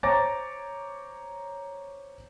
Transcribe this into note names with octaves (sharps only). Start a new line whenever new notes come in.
C5 C#5 A#5 D6 A6 A#6